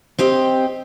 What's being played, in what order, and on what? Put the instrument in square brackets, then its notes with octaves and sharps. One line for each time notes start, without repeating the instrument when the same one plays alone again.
[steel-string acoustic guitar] C4 G4 C5 D#5